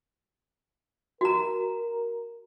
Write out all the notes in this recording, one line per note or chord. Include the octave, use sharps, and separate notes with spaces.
F#4 A#4 A#5